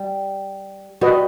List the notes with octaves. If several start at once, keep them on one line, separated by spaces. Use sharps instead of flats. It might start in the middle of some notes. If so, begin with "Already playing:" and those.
Already playing: G3
G3 F#4 B4 D#5